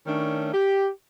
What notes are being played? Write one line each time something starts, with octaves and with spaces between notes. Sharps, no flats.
D#3 A3 C#4 D4 C#5
G4